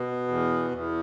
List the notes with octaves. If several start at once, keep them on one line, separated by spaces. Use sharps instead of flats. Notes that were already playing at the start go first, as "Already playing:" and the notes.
Already playing: B2
E2
E2